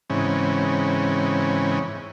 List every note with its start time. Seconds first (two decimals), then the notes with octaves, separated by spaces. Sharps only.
0.10 G#2 C#3 E3 C4 C#4